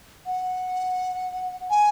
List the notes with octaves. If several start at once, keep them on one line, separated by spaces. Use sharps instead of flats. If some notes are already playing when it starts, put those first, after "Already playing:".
F#5
G#5